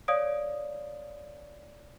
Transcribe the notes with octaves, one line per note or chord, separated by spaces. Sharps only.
C#5 D5 F5 D#6 D7